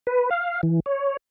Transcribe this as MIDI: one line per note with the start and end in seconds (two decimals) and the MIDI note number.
0.07 0.30 71
0.31 0.61 77
0.63 0.80 52
0.86 1.17 73